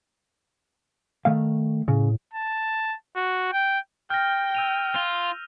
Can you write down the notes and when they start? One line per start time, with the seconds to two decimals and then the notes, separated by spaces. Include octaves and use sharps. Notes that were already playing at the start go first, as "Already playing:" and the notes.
1.25 D#3 A3 F5
1.88 A2 C#3
2.34 A5
3.16 F#4
3.53 G5
4.10 G5 F6 G6 A#6
4.55 E6 D#7 F7
4.95 F4